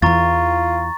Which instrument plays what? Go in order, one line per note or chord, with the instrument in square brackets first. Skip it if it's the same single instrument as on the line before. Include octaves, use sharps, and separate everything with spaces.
[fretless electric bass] E2 E3 [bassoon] F4 [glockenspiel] A#5 C#6 A6